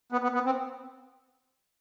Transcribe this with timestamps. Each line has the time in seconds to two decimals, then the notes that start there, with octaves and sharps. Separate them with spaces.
0.12 B3
0.23 B3
0.34 B3
0.46 C4